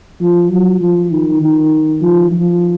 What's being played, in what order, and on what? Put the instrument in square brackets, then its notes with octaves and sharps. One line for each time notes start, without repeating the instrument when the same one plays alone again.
[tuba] F3
F#3
F3
D#3
D#3
F3
F3